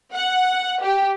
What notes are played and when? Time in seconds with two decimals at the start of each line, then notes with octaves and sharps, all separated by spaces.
0.13 F#5
0.83 G4